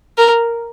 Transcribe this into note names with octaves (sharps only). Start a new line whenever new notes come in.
A#4